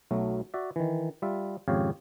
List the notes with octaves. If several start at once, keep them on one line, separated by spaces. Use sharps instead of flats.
B1 F#3 A3
F#4 D5 E5
D#3 E3
G3 F4 E5
G#1 F2 C#3 G4 C#5 F5